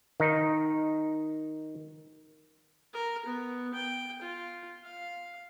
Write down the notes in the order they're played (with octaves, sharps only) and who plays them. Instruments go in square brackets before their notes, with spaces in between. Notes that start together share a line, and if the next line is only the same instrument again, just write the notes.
[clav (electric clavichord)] D#3 D#4
[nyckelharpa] A#4
B3
G5
F4
F5